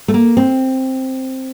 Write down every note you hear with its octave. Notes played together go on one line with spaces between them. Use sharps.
A3
A#3
C4